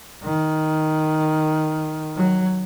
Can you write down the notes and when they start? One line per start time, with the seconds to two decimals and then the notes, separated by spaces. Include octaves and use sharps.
0.23 D#3
2.16 F#3